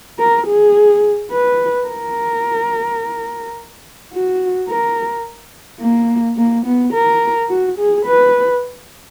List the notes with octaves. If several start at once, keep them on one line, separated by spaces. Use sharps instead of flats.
A#4
G#4
B4
A#4
F#4
A#4
A#3
A#3
B3
A#4
F#4
G#4
B4